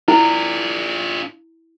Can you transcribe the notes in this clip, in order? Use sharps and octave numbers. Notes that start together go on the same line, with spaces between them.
D4 E4 F4